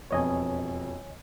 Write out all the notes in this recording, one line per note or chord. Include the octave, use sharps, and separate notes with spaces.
E1 F2 B4 C#5 D#5 G#5